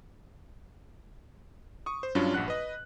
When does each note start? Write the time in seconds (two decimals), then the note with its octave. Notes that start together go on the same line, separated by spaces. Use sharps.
1.86 C#6 D#6
2.03 C5
2.15 G2 F#3 C#4 D4 F4
2.34 A#1 G2 F#5 F#6
2.48 B4 D#5